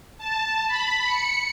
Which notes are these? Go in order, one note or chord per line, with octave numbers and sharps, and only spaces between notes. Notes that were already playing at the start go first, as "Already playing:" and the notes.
A5
B5
C#7